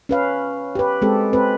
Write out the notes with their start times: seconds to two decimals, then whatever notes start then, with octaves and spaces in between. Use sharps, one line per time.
0.09 C#4 B4 F5
0.75 G4 B4
1.02 G#3 C4 G4 A4
1.33 C4 B4